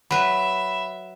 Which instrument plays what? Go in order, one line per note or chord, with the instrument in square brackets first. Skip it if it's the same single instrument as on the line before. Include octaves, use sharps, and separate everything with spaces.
[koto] F#3 B4 [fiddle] E5 [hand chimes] B5